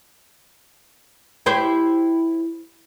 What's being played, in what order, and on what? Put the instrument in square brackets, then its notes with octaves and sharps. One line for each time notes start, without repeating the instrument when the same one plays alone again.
[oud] E4 G4 C5